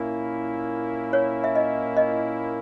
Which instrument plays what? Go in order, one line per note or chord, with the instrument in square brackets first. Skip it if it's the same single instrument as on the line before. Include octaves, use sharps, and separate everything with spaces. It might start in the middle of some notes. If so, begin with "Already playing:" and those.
Already playing: [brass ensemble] A#2 A#3 C#4 E4
[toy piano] C#5
E5
D#5
D#5